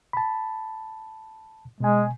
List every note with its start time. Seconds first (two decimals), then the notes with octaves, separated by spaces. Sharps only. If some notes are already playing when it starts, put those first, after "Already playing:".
0.13 A5 B5
1.80 B2 G#3 G#5